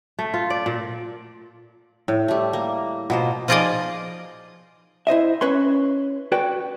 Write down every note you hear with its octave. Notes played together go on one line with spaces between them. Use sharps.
A3
F4
D5
A#2
A2
G3 A3
A#3
B2 A#3 F4 C5
F3 D#4 F4 G#4 D5 D#5
E4 C5 D#5 E5
C#4 B4 C#5 C6
F#4 B4 D5 G5